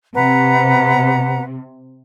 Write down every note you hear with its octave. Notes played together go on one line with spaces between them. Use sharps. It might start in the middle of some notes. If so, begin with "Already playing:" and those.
C3 B4 F#5 A#5